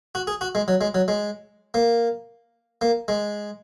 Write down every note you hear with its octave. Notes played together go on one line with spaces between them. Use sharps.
F#4
G#4
F#4
G#3
F#3
G#3
F#3
G#3
A#3
A#3
G#3